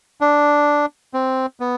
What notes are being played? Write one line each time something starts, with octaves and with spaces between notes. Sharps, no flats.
D4
C4
B3